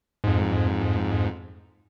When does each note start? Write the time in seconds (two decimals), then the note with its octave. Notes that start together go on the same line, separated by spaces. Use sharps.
0.24 F2 G#2